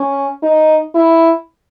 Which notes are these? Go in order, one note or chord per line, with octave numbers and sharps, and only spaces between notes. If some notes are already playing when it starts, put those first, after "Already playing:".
Already playing: C#4
D#4
E4